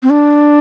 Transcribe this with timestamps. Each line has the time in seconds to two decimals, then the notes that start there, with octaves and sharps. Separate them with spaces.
0.03 C4
0.10 D4